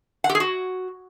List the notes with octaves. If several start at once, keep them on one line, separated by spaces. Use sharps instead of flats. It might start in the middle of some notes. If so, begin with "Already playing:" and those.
F#5
G4
G#4
F#4